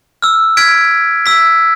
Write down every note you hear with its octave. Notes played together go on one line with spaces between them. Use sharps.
E6 F6
F6 G#6 B6 D7
E6 B6